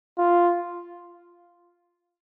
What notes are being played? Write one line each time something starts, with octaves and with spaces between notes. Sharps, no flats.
F4